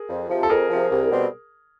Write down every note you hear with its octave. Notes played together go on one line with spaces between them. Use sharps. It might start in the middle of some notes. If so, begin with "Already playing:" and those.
Already playing: G#4 A#4
F2
C3 F3
A4
F2 G#4 A#4
C3 F3
C2
B2 G3 C4